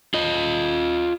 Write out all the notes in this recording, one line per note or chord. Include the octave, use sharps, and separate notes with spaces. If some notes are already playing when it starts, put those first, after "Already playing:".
F4 D#5